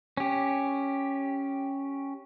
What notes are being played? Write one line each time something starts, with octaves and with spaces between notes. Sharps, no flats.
C#4 G4